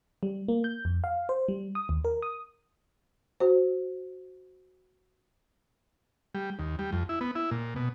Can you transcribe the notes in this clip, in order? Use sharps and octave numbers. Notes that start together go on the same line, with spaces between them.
G3
A#3
G6
F2
F5
C5
G3
D#6
D#2
A#4
D#6
F#4 C5
G3
D#2
G3
F2
E4
B3
E4
A#2
B2